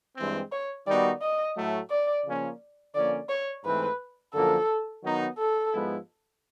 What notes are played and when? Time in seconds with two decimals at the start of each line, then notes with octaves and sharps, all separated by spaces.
0.17 G2 E3 G#3 C4
0.52 C#5
0.87 D#3 G3 B3 D#4 F#4 D5
1.22 D#5
1.56 A2 F#3 A3
1.90 D5
2.25 C#3 F3 A#3 C#4 F4
2.95 D3 F3 A#3 C#4 D5
3.29 C#5
3.64 G#2 E3 A3 C4 B4
4.34 F#2 D3 F3 A#3 A4
5.03 D#3 F#3 B3 D#4
5.38 A4
5.73 G#2 F3 G#3 B3 E4